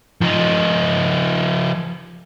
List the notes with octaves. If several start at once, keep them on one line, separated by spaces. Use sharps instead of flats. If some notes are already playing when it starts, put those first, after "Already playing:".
F3 D#4